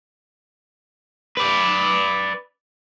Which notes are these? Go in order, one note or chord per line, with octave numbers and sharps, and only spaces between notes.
B4 D5